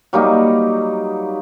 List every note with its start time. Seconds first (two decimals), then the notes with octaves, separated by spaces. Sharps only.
0.13 F#3 G3 A#3 D#4